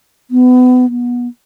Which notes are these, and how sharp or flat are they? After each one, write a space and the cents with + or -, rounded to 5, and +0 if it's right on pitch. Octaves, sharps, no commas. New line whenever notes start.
B3 +30
B3 -25